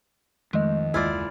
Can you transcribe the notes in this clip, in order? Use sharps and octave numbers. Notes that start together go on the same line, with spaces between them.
F2 D#3 G#3 A3 D#5
F#1 D#2 G#3 E4 F4 D5 G#5 B5